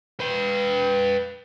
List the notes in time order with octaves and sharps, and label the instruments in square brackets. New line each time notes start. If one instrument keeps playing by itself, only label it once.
[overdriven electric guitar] B4 G5